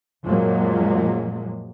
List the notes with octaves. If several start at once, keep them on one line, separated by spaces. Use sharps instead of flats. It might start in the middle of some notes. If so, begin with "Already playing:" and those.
F#2 A#2 F3 F#3 G#3 A#3